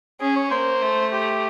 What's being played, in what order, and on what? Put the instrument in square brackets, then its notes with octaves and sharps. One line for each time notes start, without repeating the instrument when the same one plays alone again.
[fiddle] C#4 [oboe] G#4
[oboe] C#5
[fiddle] A#3 [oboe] C5
[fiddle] A3
[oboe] G4